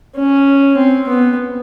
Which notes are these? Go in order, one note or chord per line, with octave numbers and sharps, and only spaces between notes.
C#4
C4
B3